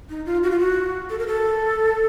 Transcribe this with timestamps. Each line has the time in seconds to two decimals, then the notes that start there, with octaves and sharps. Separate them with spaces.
0.10 D#4
0.26 F4
0.43 F#4
0.51 F4
0.59 F#4
1.10 A4
1.19 A#4
1.27 A4